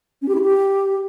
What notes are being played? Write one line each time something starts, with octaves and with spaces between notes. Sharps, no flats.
C#4
G4
E4
G4